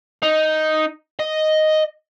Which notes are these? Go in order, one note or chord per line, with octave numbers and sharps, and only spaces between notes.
D#4
D#5